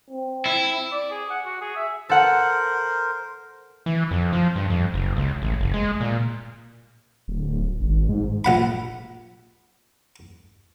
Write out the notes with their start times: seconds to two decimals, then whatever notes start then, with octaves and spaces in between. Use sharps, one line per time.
0.10 C4
0.46 E4
0.92 D5
1.11 G#4
1.30 F#5
1.45 F#4
1.61 G#4
1.76 E5
2.09 A4 A#4 C5 F#5
3.86 E3
4.11 F2
4.33 F3
4.56 G2
4.70 F2
4.94 F#1
5.16 C#2
5.42 A1
5.60 F#1
5.74 G#3
6.01 A#2
7.28 D1
7.80 G#1
8.09 G#2
8.45 A#1 F#5 B5